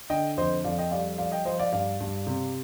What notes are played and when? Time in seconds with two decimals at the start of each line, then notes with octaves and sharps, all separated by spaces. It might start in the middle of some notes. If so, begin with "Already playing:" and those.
0.10 D3 D#5 G5
0.37 F2 C5 D#5
0.65 F2 D5 F5
0.78 D#5 G5
0.91 G3 D5 F5
1.18 F3 D5 F5
1.32 D#5 G5
1.45 F3 C5 D#5
1.59 D5 F5
1.72 G2 D5 F5
2.00 G2
2.27 C3